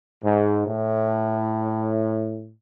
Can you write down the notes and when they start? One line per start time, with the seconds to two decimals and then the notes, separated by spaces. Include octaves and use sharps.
0.23 G#2
0.67 A2